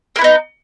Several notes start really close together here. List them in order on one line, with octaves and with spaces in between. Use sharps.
A#3 E4 B3 D#4